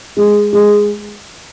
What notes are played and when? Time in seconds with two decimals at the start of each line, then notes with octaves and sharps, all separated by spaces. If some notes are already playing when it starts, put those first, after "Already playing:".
0.17 G#3
0.53 G#3